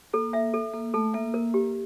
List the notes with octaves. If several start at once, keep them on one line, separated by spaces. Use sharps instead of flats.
A#3 A4
E5
A4
A#3 A4
A3 A4
A#3 E5
A#4
G4